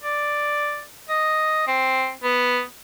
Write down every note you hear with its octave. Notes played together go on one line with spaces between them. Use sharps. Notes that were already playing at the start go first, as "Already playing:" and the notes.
D5
D#5
C4
B3